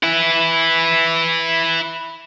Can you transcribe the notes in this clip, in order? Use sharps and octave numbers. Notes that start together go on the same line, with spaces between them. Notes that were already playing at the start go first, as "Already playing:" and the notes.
E4 B4